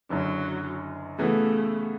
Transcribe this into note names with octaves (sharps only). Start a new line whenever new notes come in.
F#1 F#2 D3 F#3
C#3 E3 A3 B3 F#4